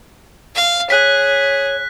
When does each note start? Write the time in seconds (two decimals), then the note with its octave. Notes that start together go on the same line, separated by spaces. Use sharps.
0.55 F5
0.90 G#4 C#5 F#6 B6